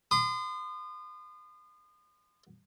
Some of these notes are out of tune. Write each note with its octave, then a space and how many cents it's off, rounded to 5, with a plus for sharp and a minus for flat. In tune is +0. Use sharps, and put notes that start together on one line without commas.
C6 -35 D#6 -35